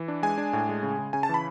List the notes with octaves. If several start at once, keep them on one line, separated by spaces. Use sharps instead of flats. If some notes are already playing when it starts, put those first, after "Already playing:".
Already playing: E3
D4
G#3 G#5
D4
A2
G#3
C#3
C#3
C#3 G#5
A5
E3 B5